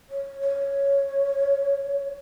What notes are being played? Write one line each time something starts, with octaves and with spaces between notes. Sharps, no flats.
C#5
C#5